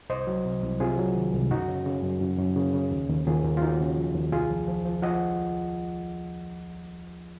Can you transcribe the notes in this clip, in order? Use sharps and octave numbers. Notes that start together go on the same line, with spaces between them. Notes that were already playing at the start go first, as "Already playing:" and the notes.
C2 C5 D#5
F#3
C3
C2
C3 F4 G#4
F#3
D#3
C2
F#2 D#4 F#4
C#3
C#3
F#2
F#2
F#2
C#3
C#3
D#2
D#2
D#2 F4 G#4
D#2
F4
D#2 D#4 F#4
C#3
F3
D#2
C2 F4 G#4
F3
F3
F3
F3 D#5 F#5